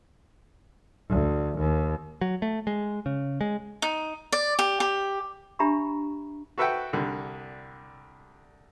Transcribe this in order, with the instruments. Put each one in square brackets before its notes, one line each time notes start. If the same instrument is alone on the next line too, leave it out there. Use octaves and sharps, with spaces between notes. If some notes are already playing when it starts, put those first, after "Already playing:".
[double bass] D2
D#2
[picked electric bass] F#3
A3
G#3
C#3
G#3
[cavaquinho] D#4
D5
G4
G4
[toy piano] D4 G4 E5 A#5 B5 C#6
[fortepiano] F#4 A4 B4 E5 F#5 G5
C2 D3 G3